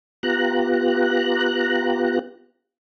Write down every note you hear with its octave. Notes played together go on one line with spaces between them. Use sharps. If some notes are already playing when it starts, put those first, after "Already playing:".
B3 F4 G4 A#5 F#6